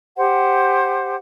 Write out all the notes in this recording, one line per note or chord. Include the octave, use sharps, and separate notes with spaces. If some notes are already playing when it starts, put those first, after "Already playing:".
G4 C5 F#5